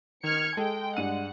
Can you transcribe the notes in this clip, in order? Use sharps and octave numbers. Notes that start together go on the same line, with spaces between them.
D#3 F6 G#6 C#7
G#3 A4 G5
G2 D4 F#5 D#7